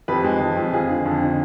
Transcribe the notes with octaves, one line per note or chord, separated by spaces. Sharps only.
F2 G4 B4
G#3
F2
F2
F2 F4 G#4
D3
F2
D3